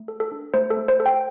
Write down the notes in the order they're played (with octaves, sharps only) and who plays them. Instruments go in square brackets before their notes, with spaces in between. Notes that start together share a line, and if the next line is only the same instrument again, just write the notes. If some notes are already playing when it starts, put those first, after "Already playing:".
Already playing: [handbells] A3
A4
A4
D4
A3 C5
A4
A3
C5
A4
G5